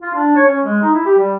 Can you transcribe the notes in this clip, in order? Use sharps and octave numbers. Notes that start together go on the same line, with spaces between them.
F4
D4
C#5
C#4
G#3
D#4
E4
G4
G3